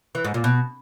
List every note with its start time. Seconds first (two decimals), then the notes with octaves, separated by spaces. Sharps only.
0.15 E3
0.25 G#2
0.34 A#2
0.44 B2